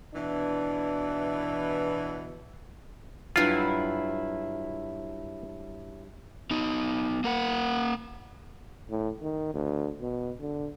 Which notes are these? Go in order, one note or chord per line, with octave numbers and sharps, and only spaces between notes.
B2 E3 D4
G2 F#3 E4 F4
B3 D#4
A#3 A#4 F#5
A2
D#3
D2
B2
D3